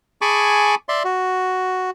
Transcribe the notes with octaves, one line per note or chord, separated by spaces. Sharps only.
G#4 G#5 A5 B5 C#6 D6
D5 E5 C6
F#4